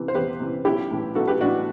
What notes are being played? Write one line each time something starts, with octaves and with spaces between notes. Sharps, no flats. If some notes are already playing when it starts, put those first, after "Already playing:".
Already playing: C3 E3
C5
E2 G4 B4
C3 E3
B1 E4 G4
A2 E3
B1 F#4 A4
G4 B4
A2 E3 D4 F#4